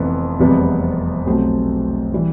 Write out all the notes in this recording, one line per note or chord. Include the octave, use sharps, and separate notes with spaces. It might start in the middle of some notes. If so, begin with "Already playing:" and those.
Already playing: F1 F2 E3 B3
F1 E2 C3 G3 B3
B1 B2 A3 C4 G4
E3 G3